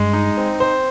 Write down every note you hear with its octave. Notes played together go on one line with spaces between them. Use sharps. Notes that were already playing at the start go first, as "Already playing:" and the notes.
Already playing: G2 G#3
D#4
C4
C5